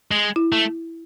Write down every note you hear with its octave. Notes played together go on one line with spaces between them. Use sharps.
G#3
E4
A3